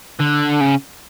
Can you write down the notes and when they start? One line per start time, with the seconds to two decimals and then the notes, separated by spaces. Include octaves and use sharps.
0.19 D3
0.61 C#3